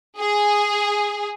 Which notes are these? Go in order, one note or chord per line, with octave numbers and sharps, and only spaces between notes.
G#4